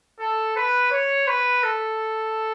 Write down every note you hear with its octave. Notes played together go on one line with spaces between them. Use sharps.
A4
B4
C#5
B4
A4